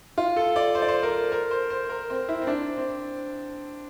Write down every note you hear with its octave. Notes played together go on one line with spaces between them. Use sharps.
F4
A4
D5
C5
D5
C5
A#4
A#4
C5
C5
A#4
C4
E4
C4
D4
C4